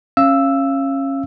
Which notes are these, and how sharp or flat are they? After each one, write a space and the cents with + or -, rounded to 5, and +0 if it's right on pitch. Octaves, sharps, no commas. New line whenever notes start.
C#4 -25 F5 -25 E6 +0